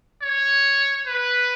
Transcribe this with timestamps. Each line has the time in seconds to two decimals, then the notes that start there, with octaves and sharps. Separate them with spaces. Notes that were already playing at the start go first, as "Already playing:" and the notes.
0.22 C#5
1.07 B4